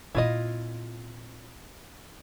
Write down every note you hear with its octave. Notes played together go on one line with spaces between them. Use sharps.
A#2 C4 E4 F4 D#5